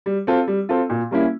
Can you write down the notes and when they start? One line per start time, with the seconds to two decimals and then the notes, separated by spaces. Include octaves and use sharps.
0.06 G3
0.27 C4 F4 A4
0.48 G3
0.69 C4 F4 A4
0.90 A#2
1.11 G3 A#3 C#4 E4